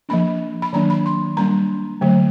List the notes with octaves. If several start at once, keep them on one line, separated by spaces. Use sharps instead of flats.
F3 A#3 D4 B5
B5
D#3 F#3 A#3 D4 A#5
B5
C6
G3 A#3 D4 A#5
D3 F#3 A3